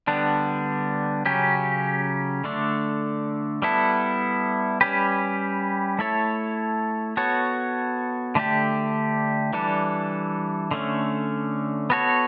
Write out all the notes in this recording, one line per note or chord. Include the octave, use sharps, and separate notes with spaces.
D3 G3 B3 D4
C#3 F#3 C#4 G4
D3 A3 D4
G3 B3 E4 A4
G3 C#4 G4 B4
A3 E4 A4 C#5
B3 F#4 A4 C#5
D3 A3 D4 G4
E3 G3 D4 A4
D3 A3 C#4
B3 F#4 A4 C#5